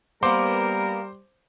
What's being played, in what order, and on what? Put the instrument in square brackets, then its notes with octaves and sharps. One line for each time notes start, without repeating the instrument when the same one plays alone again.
[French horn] G3 [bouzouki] A#3 B3 [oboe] A#4 [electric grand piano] C5 C6 D6